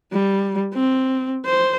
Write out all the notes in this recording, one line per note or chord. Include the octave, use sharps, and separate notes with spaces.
G3
C4
C5